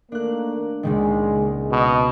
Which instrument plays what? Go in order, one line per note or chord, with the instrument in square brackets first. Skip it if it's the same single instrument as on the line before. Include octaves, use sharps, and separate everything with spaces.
[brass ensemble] D#3 A3 A#3 [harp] D4 F#6
[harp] C#2 A#2 D#3 [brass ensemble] G#3
[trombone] B2 [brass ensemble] D#5